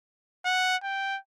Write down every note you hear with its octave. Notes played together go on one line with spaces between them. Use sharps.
F#5
G5